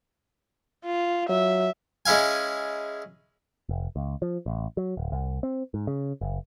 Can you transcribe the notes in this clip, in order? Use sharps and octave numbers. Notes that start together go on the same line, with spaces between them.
F4
F#3 E5
G#3 C#4 E4 F5 G#5
F1
C#2
F3
A1
F#3
D1
C2
C4
G#2
C#3
F#1